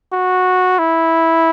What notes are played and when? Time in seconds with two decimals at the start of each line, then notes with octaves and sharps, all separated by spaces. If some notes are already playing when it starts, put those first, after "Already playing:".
0.13 F#4
0.79 E4